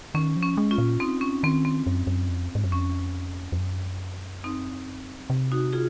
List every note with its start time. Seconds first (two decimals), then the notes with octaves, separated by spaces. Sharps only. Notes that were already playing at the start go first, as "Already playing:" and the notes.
0.15 D#3 C#4
0.36 F3
0.43 C#4
0.57 G#3
0.71 C#4 F4
0.78 A#2
1.00 C4 D#4
1.21 C#4
1.43 D#3 C4
1.65 C4
1.87 F#2
2.07 F#2
2.29 F2
2.55 G#2
2.64 F#2
2.72 F2 C#4
3.52 F2
3.58 F#2
4.44 C4 D#4
5.30 C3
5.52 D#4 F#4
5.73 F4 G#4